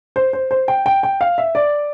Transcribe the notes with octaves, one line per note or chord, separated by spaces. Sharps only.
C5
C5
C5
G5
G5
G5
F5
E5
D5